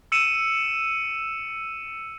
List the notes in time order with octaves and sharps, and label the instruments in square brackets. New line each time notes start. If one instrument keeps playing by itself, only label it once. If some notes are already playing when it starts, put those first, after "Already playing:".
[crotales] E6 C#7 D#7 E7